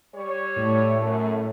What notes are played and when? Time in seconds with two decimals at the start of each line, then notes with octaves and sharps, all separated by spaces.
0.15 G3 C#5
0.56 A2 A3
1.01 F#2